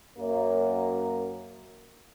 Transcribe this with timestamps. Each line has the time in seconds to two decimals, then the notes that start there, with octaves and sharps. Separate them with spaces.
0.19 F#2 A#3